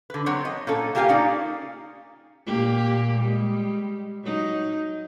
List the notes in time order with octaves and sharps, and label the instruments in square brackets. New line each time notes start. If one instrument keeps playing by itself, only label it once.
[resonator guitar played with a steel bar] D3 B4
F#3 B3 C4 C#5
D#5
A#2 C#4 A4
A#3 F4 G4 G#4 F5 G#5
A#3 C#4 D#4 D5
[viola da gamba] A#2 A#3 G4
G3 G#3
F#3 D#4